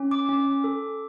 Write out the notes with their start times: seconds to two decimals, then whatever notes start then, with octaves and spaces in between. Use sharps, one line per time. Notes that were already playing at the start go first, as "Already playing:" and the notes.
Already playing: C#4
0.11 D6
0.29 C#4
0.64 A4